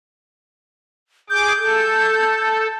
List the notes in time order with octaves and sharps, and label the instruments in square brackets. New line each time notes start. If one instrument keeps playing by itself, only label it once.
[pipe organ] G#4 D6 [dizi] G6
[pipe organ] A4